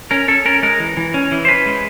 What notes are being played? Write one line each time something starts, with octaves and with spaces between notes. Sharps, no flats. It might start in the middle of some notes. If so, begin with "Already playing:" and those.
C#4 A#4
C#4 A4
C#4 A#4
G#3 A#4
E3
E3
C#4
E3
C5
C#4 B4
G#3